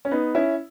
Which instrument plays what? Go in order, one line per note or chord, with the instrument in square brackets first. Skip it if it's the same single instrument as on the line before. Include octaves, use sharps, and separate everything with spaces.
[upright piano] C#4
B3 D#4
C#4 E4